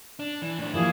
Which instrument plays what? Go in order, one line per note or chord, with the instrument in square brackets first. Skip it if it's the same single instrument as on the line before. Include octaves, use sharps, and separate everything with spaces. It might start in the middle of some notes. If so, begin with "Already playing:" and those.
[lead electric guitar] D4
E3
A2 D4
[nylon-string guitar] E3 F3 G3 [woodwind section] A#3 G#4 [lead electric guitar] E4